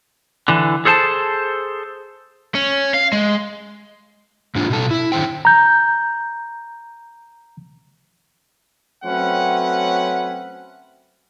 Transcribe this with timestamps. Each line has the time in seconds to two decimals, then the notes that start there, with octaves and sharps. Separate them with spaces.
0.48 D3 E3
0.85 G#4 A4 C5 F#5 A5
2.55 C#4
2.94 F5
3.13 G#3
4.55 G#2 D4 F4
4.70 B2 A4
4.91 E4
5.12 F#2 D3 D#3 C5 G5
5.45 A#5 G6
9.04 F#3 A3 C4 C#4 B4 F#5